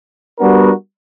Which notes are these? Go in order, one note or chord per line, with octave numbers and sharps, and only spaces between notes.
G3 B3 D4 F#4 A#4